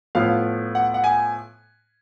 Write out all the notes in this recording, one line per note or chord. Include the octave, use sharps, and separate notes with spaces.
A2 F3 B3 F4 F5
F#5
F#5
G#5